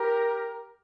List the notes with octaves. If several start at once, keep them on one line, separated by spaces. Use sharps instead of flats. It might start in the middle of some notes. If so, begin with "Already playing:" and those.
Already playing: G4 A#4